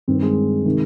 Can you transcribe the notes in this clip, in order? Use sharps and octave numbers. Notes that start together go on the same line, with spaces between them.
G2 D#3 C4
G#3
C3 D#3